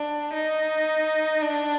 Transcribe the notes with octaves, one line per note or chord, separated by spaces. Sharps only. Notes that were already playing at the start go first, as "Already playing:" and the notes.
Already playing: D4
D#4
D4